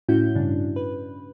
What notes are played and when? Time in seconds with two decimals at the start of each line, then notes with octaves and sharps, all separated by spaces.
0.09 A2 C#4 E4 F#4 G6
0.35 G2 C#3 D4
0.76 B4